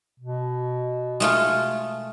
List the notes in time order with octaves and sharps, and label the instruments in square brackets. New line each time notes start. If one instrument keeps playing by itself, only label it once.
[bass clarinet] B2
[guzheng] G#3 A3 F4